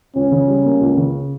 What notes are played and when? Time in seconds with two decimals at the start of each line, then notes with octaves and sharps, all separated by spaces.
0.15 C#2 C#4
0.31 C#3
0.48 G3
0.65 A#3
0.81 C#2
0.97 C#3